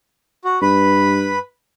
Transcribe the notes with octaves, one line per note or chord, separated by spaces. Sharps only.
F#4
G2 B4 B5